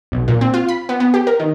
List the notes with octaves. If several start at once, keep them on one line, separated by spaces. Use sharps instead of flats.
B1
A#2
C4
F4
B5
B3
B3
G4
A#4
D#3